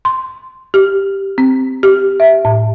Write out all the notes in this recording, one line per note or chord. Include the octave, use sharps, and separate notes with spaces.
C6
G4
C4
G4
E5
A2